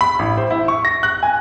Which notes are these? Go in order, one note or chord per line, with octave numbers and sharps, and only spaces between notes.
B5
A1
C5
E4
C#6
A#6
F#6
G#5